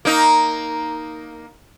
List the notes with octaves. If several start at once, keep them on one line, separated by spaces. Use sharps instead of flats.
A#3 D#4